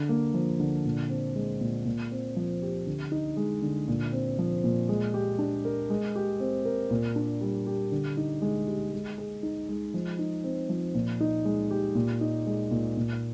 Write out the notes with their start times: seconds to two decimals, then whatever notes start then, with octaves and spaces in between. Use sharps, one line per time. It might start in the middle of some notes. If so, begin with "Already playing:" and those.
Already playing: D3
0.09 A#3
0.34 F3
0.60 D3
0.85 A#2
1.10 C4
1.35 G#3
1.61 A#2
1.85 A#2
2.12 C4
2.36 F3
2.62 G4
2.87 D3
3.12 D#4
3.37 G#3
3.62 D3
3.88 A#2
4.12 C4
4.39 F3
4.64 A#2
4.89 G#3
5.14 G4
5.39 D4
5.65 A#4
5.90 G#3
6.16 G4
6.40 C4
6.65 A#4
6.91 A#2
7.16 D4
7.41 G3
7.67 G4
7.92 D3
8.17 D#4
8.42 G#3
8.67 G4
8.93 G#3
9.18 G#4
9.43 D#4
9.69 G#3
9.94 F3
10.19 D#4
10.44 C4
10.69 F3
10.95 A#2
11.20 D#4
11.45 G#3
11.71 G4
11.95 A#2
12.21 D#4
12.47 G#3
12.71 A#2
12.97 A#2